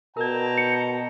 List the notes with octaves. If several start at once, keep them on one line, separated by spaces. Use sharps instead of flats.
B2 A#4 D5 G5 A5 A#5
C#7